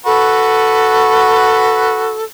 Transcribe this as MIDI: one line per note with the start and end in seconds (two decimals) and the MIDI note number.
0.06 2.17 66
0.06 2.24 69
0.06 2.17 71